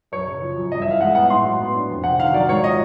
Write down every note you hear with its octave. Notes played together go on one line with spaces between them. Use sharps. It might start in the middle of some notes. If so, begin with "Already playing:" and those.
F#2 C#5
C#3
F3
F#2
G2 D#5
E5
E3
F5
G#3 F#5
B3 F#5
A2 C6
F#3
B3
D4
F2
C3 F#5
D#3 F5
F#3 D5
G#2 C#5
F3 D#5